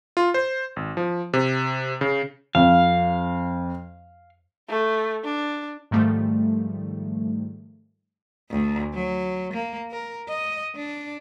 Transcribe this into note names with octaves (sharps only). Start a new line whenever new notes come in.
F4
C5
G#1
F3
C3
C#3
F2 F5
A3
D4
G#2 D#3 F3 G3 A3
D2
F#3
A#3
A#4
D#5
D4